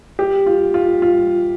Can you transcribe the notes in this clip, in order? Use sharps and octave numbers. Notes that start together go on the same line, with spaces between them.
G4
F4
F4
F4